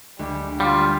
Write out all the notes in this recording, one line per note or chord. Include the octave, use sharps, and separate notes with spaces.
D2 G3 G#3
G3 F4